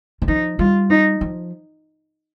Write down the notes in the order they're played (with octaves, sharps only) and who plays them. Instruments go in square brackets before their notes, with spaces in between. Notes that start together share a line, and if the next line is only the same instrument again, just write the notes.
[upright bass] D#3
[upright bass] F3 [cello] D#4
[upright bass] G3 [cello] F4
[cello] D#4
[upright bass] F3